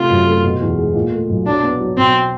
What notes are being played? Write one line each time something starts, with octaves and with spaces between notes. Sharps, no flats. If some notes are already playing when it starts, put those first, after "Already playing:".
Already playing: C3 A3 F4
F#2
A3
B2
E2
G#3
A#2
A3
B1
F#3 D4
B3
F#3
B2 C4